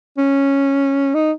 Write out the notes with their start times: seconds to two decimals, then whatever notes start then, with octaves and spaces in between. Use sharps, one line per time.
0.18 C#4
1.15 D#4